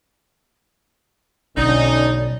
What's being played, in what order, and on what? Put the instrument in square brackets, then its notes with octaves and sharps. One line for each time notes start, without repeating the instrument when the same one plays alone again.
[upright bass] B1 [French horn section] D3 C#4 [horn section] D#4 [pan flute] D5